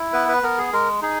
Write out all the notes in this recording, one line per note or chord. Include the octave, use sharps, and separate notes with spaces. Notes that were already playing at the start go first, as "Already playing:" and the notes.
Already playing: E4
B3 B4
B4
B3 A#4
G#4
G#3 A#4
D#4 G#4